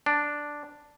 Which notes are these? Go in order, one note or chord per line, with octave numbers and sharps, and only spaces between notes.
D4